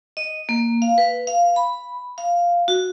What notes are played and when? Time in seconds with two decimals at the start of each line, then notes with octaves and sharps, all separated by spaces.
0.17 D#5
0.49 A#3
0.82 F5
0.98 B4
1.27 F5
1.56 B5
2.18 F5
2.68 F#4